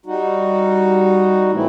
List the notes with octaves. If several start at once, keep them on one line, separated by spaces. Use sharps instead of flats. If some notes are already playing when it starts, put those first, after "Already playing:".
G3 D#4 F#4
A2 E3 A3 C4 E4